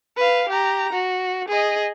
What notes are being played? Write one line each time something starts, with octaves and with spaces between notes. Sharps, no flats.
B4 F5
G4 A#5
F#4
G#4 D#5